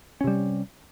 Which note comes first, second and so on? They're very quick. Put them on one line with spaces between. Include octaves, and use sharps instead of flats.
C#4 C3 G3